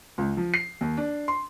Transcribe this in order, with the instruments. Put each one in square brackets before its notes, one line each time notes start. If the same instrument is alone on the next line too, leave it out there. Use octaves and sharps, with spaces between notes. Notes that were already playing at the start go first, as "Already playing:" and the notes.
[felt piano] C#2
F3
C7
D#2
D4
C6